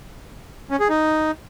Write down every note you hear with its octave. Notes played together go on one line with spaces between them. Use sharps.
C#4
G#4
D#4